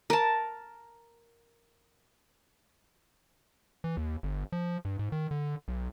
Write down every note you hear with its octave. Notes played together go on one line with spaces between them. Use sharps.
A#4 A5
E3
D#2
G1
F3
G2
G#2
D#3
D3
B1